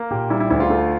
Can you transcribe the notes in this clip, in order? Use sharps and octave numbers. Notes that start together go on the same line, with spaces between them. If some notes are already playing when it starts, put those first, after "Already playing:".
Already playing: A#3
A#2 G4
G3 E4
E4
D2 E4
F4
A3